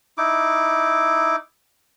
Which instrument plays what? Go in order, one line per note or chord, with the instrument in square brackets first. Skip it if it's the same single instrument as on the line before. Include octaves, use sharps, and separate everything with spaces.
[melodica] D#4 E4 D6